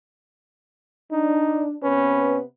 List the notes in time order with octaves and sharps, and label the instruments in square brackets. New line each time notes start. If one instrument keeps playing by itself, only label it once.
[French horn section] D4 [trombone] D#4
[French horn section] C3 B3 B4 [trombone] C#4